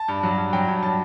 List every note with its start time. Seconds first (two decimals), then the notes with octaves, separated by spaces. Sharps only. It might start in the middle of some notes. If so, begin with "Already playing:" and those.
Already playing: A5
0.08 G2
0.23 F#3
0.38 G2
0.53 F#3 G5
0.68 G2
0.83 F#3 A5